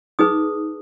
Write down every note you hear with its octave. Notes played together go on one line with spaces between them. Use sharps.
D#4 G#4 B4 D#6